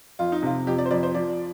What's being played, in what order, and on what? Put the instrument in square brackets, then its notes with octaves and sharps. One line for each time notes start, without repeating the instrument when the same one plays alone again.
[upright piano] F2 [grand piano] F4
[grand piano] D#4
[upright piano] C3 [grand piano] F4
[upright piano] F2 [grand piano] G4
[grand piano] D5
C5
[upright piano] F2 [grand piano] D5
[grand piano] C5
[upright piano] F3 [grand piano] D5